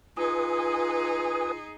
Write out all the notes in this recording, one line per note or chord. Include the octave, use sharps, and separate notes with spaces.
D#4 F4 G#4 B4 G#5 D#6